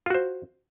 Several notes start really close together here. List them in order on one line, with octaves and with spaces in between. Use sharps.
F4 F#4 C5